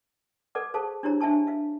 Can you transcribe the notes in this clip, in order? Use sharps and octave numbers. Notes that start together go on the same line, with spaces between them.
A4 B4 D5 F#5 D6
G#4 A4 C5 F5 A5 C#6
D4 E4 G4 C5 C#5 A#5
D4 E5 G#5 A5 C#6
E5 F5